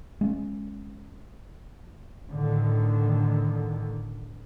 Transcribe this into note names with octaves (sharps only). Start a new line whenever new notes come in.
G#3 C#4
A2 D3 D#3